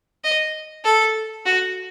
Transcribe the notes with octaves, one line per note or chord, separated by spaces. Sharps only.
D#5
A4
F#4